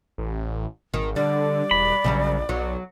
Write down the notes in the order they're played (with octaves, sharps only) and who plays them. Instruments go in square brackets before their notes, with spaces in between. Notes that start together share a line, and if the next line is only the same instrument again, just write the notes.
[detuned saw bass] A1
[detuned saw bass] G#1 [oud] D#3
[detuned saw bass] D3 [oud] G3 [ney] D5
[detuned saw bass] E1 [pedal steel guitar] B5
[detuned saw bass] A#1 [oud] C#3 F#3 G3
[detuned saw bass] B1 [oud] F#3